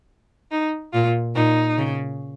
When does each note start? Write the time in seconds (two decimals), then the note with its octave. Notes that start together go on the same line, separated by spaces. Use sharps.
0.52 D#4
0.93 A#2 F4
1.36 A#2 D#4
1.78 C#3